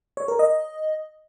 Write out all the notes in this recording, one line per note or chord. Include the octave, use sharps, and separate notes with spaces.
C#5
A#4
D#5